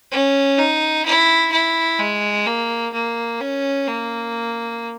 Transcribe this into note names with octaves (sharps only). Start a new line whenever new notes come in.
C#4
D#4
E4
E4
G#3
A#3
A#3
C#4
A#3